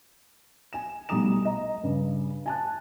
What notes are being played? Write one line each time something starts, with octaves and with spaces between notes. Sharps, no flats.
G#5 E7
B1 G3 A3 A#5 D#6 E7
D#5 A#5
G2 C#3
G#5 A5 F#6